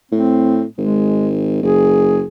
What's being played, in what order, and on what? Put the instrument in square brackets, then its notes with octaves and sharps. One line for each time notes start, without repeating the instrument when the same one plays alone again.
[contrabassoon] A2 [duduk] C4
[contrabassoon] G#1 [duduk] G#3
[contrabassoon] F#1 [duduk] G#4